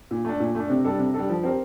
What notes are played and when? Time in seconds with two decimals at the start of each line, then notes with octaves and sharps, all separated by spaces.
0.11 A#2
0.25 A3 D4
0.40 A#2
0.55 A3 D4
0.70 C3
0.84 G3 D4 A4
0.99 C3
1.14 G3 D4 A4
1.29 F3
1.43 C4 G4 A#4